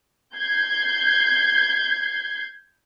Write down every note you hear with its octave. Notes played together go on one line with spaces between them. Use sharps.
G6 G#6 C7